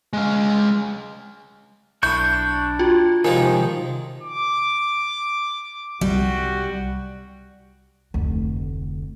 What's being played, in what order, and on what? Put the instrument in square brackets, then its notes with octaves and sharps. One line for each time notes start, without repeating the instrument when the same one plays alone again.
[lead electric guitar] G#3 F5
[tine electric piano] B1 [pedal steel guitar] D4 C#6 G6 [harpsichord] E4
[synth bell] F4 F#4 [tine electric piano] G5
[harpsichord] C2 F3 G#3 [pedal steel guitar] D#3 [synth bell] A#4 [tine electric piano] G#5
[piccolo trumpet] D6
[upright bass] C2 [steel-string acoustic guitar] G3 [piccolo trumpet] F#4
[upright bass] F1 D2